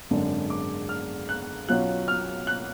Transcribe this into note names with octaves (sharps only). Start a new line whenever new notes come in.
G#1 F#2 D3 G#3 D4
D6
F6
F#6
B1 B2 F#3 C#4 F4 F#6
F6
F#6